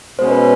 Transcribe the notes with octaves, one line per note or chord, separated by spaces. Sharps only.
B2 G#3 C#4 C5
B4